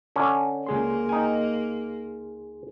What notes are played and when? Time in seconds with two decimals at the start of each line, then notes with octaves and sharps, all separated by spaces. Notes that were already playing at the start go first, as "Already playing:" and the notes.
0.16 D3 C#4
0.67 C#2 A#3 G#4 C6
1.09 D#4 G5 G#5